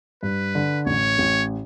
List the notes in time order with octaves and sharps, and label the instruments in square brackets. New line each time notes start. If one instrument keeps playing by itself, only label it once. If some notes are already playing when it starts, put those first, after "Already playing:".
[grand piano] G2 [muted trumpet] B4
[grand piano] D3
[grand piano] A1 [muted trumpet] C#5
[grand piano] A1